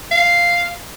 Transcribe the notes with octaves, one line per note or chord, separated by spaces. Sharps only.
F5